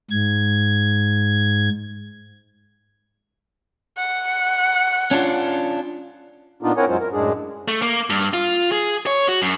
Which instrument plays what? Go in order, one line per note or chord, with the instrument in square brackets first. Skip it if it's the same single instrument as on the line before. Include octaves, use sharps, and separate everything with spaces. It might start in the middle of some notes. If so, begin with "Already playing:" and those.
[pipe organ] G#2 G#6
[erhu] F#5
[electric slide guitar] C#4 D4 F4
[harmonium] A#2 B3 D4 D#4 F4
C4 E4 A#4 C#5 F#5 G#5
F#2 F#3 G#3 C#4 F4 C5
A#4
F#2 A2 G#3 D4 G#4
[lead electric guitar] A3
A#3
G2
F4
G#4
C#5
F#4
F#2